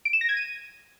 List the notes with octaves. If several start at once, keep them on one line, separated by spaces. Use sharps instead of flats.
D7
E7
A#6
G#6
D#7